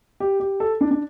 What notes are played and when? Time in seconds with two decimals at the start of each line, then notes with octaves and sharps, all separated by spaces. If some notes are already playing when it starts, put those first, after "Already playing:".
0.20 G4
0.40 G4
0.60 A4
0.81 D4
0.91 D4